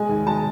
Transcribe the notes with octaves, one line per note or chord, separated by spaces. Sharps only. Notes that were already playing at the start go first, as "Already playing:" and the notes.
Already playing: G#3 G#5
D#2
G#3 A5